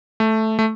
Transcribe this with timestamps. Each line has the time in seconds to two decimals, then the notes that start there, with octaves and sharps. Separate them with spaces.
0.20 A3
0.59 A3